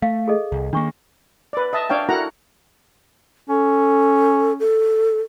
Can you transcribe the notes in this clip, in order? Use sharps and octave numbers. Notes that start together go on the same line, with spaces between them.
A3 F5
G#4 A4 D#5
C2
D#3 A#3 D4 C#6
B4 D5
D#5 E5 A5
D4 C#5 F5 G5
E4 F#4 A4 A#4 F#5 A#5
C#4 A4
A4